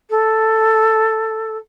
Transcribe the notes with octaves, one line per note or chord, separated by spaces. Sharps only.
A4